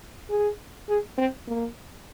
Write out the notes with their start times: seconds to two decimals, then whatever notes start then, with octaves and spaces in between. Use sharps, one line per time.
0.29 G#4
0.88 G#4
1.18 C4
1.47 A#3